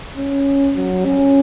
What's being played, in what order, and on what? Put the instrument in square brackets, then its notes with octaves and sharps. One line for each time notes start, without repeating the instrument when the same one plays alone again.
[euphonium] C#4
F#3
C#4